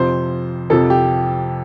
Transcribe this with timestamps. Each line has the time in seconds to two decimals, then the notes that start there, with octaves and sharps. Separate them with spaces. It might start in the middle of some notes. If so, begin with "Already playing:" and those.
Already playing: F2 C3 F3 C5
0.70 F2 C3 F3 A4
0.90 G4